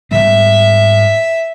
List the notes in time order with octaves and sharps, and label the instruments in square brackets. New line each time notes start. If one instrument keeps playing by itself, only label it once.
[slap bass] G#2 G3 B3 [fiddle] E5